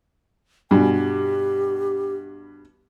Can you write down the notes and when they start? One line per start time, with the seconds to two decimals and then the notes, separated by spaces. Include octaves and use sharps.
0.71 G2 B2 G#5
0.94 G4